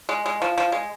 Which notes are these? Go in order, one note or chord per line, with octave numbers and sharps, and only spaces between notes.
G#3
G#3
F3
F3
G#3